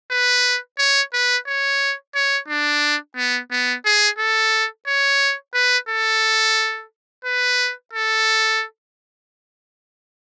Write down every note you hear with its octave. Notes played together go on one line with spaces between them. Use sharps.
B4
C#5
B4
C#5
C#5
D4
B3
B3
G#4
A4
C#5
B4
A4
B4
A4